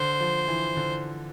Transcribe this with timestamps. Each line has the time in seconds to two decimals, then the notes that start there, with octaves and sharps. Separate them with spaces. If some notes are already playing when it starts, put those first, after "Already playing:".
Already playing: D3 C5
0.20 F3
0.48 E3
0.77 D3